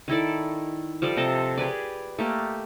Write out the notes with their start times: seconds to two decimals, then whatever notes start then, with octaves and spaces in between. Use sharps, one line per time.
0.08 D#3 E4 A4 D5
1.02 F3 G3 A4 D5
1.17 C3 A4 D#5 A5
1.57 G4 G#4 B4 D5
2.19 A3 A#3 G4